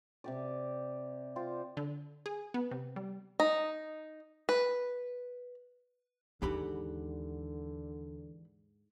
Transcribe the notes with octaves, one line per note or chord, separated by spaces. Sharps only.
C3 G4 D5
F4 C5 D5 G5
D3
G#4
B3
C3
G3
D#4
B4
D#2 G#2 D3 E3 G4 F#5 B5